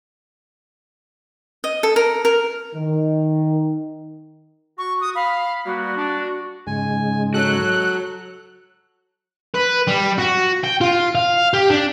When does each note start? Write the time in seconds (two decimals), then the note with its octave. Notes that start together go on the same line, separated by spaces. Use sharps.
1.64 D#5
1.83 A4
1.96 A#4
2.25 A#4
2.75 D#3
4.78 F#4 C#6
5.01 D#6
5.15 F5 B5
5.65 G3 A#3 B3 F#4
5.97 D4
6.67 G#2 C#3 G#3 G#5
7.34 F#4 A4 C#5 F#6
9.55 B4
9.88 G3
10.19 F#4
10.64 G5
10.81 F4
11.15 F5
11.54 G4
11.70 D4